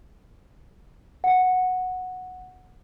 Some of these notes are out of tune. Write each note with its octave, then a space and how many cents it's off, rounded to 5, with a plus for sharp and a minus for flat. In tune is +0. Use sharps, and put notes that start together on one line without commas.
F#5 -10